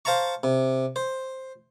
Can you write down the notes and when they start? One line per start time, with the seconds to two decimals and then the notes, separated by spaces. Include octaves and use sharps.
0.05 C5 F5 A5 A#5 C#6
0.43 C3
0.96 C5